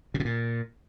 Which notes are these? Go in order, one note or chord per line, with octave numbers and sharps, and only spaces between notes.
C3
B2
A#2